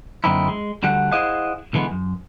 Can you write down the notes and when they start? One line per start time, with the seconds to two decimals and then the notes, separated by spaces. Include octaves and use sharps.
0.24 F#2 D3 A#3 C4 D#4 E4
0.48 G#3
0.83 D2 D3 G3 F#4 F#5
1.12 E4 G#4 C5 D#5 F5 F#5
1.73 B1 D3 E3 G#3 B3
1.91 F#2